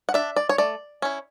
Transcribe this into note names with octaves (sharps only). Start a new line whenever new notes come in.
F#5
D4 E5
D5
C#5
A3 D5
C#4 E4